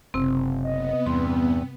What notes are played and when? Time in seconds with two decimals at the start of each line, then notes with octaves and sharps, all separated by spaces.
0.14 F#1 C3 C4
0.64 B3 D#5
1.06 E2 G2 G3 C4 C6